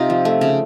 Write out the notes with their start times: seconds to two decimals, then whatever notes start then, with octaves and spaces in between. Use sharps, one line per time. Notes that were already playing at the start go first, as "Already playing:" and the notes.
Already playing: C3 D#4 F4 D#5 F5
0.10 F3
0.25 A3
0.41 C#3